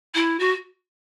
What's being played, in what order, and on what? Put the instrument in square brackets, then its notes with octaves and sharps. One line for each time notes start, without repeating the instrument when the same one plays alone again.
[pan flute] E4
F#4